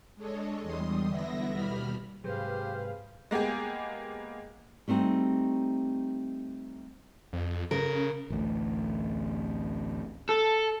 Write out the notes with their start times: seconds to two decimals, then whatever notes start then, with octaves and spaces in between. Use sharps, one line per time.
0.16 G#3 D4 A4 C#5 D#5
0.61 E2 G3 C6 D#6
1.07 D3 B3 E4 E5 A#6
1.50 D#2 B2 G3 B5 F6
2.24 G#2 C3 F#3 G4 G#4 B4 C5 F5
3.31 G#3 A#3 B3 G4 G#4
4.88 G3 A3 C4 D#4 F#4
7.33 F2
7.71 C#3 A#4
8.30 A1 D2
10.29 A4